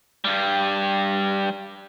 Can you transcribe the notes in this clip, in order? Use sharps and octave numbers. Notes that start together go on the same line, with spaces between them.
G2 G3